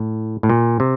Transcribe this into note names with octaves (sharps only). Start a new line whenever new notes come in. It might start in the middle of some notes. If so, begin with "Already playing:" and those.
Already playing: A2
A2
A#2
C3